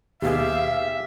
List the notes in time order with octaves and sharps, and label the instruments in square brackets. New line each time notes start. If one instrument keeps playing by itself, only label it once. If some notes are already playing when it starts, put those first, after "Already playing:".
[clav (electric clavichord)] D#2 B2 G#4 [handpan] G4 [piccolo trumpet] E5 [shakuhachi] F5